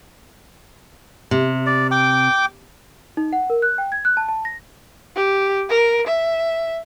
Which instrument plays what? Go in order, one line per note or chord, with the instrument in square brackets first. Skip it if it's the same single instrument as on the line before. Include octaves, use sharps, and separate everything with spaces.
[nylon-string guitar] C3
[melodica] D5
G5 D6
[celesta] D#4
F#5
A#4
F#6
G5
G#6
F#6
A5
A5
A#6
[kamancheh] G4
A#4
E5